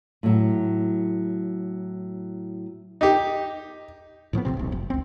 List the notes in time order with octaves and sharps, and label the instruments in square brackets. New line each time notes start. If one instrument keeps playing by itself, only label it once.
[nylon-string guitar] A2 F#3
[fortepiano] D#4 G4
[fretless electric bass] A2 F3 F#3 B3
A#1 F#2 C3 C4
D1 B1
F1
C#2 C4